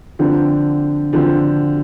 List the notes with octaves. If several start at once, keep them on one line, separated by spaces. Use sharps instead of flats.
D3 F3 C4
D3 F3 C4